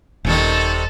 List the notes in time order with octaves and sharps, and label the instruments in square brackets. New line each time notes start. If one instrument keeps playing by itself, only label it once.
[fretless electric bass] D#1 [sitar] C3 D#3 G3 [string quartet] A4